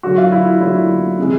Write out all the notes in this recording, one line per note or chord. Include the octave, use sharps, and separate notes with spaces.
F#2 D3 F#3 F#4
F4
E4
F#2 D3 F#3 E4
C3 E3 G#3